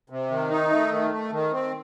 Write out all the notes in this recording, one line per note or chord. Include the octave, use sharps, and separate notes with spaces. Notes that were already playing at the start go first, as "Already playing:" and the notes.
C3
D#3
D#4
A3
D#3
A3
D#3
C4